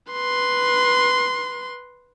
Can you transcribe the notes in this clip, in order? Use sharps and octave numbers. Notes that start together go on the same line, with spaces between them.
B4 C6